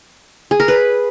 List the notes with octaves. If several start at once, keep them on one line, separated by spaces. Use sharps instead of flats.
G#4
A#4
B4